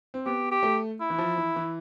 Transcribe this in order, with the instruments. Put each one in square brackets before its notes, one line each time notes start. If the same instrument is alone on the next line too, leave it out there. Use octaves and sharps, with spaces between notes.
[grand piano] C4
[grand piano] B3 [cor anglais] G4
[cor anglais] G4
[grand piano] A3
[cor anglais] E4
[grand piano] E3
F3
E3
E3